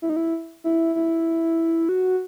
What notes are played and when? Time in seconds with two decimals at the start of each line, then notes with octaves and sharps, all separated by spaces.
0.02 E4
0.09 D#4
0.16 E4
0.64 E4
0.95 E4
1.89 F#4